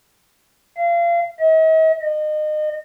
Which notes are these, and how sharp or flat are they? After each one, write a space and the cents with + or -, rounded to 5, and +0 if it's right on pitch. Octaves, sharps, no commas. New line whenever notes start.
F5 -30
D#5 +45
D#5 -30